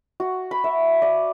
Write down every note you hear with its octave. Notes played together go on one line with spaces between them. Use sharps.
F#4
B5
E5
D5